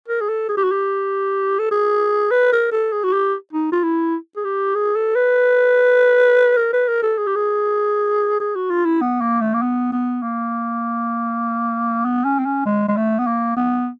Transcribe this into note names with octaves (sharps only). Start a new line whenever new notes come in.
A#4
G#4
A4
G#4
G4
F#4
G4
A4
G#4
B4
A#4
A4
G#4
F#4
G4
D#4
F4
E4
G#4
G4
G#4
A4
B4
A#4
B4
A#4
A4
G#4
G4
G#4
G#4
F#4
F4
E4
B3
A#3
A3
A#3
B3
B3
A#3
B3
C#4
C4
C#4
G#3
G#3
A3
B3
A#3
B3